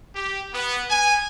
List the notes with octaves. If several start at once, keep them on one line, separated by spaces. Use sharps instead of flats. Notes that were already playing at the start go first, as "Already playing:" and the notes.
G4
B3
G#5